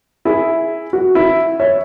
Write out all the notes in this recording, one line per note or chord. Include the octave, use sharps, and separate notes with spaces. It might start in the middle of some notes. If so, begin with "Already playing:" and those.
E4 G#4
F#4
E4
C#5 E5